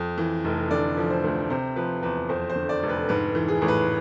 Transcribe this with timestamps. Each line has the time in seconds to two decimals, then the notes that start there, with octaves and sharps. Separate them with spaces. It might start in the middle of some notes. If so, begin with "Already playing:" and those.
Already playing: F2
0.18 E3
0.45 F1
0.71 D3 D5
0.97 F3
1.10 C5
1.24 D2
1.50 C3 C5
1.76 F3 B4
2.02 E2 B4
2.29 F2 C5
2.50 C5
2.56 D3
2.69 D5
2.83 F1
2.89 B4
3.09 G#2 B4
3.35 E3
3.48 G#4
3.62 A1
3.68 B4